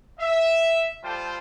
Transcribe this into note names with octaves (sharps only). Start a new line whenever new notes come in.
E5
G3 F4 A4 C5 G5 A5